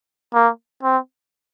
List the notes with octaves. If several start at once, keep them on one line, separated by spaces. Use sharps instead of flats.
A#3
C4